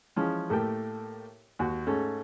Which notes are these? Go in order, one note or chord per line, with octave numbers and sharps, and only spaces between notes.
E3 F3 G#3 C#4
A2 A3 A#3 G4 G5
D#2 F#4
G#2 A3 C#4